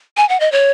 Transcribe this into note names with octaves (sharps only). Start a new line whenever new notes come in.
G#5
F#5
D#5
C#5